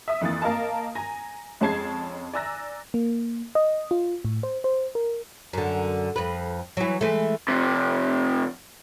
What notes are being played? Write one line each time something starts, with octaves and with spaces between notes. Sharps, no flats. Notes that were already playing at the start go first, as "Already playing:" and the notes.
E5 D#6
F2 E3 A#3 A6
A#3 A#4 D#5 F5 A5
G#5 A#5 A#6
F2 G#3 C#4 A5 G#6 C7
D5 G#5 A#5 E6 F#6 A#6
A#3
D#5
F4
A2
C5
C5
A#4
F#2 D3
F2 B4
E3 F#3
E3 G#3 A3
F2 C3